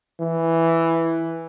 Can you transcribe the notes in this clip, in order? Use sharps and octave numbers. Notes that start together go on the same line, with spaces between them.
E3